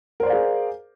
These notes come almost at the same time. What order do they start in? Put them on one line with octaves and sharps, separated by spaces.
A#4 C5 D5 F5 G#4